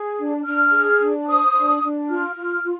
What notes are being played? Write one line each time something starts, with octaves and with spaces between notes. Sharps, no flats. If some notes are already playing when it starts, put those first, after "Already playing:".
Already playing: G#4
D4
D4 F6
G#4
D4
C5 D#6
D4
D4
F4 F6
F4
F4